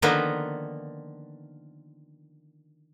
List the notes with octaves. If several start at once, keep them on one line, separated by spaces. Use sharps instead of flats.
D3 D#3 F3 A#3 B3